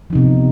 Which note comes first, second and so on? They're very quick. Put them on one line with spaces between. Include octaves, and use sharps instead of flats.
F3 D#4 C3 B3